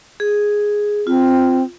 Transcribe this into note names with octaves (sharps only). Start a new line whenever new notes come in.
G#4
C4 F4